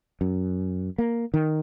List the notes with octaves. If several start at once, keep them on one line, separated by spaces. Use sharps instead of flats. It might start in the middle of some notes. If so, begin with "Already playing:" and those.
F#2
A#3
D#3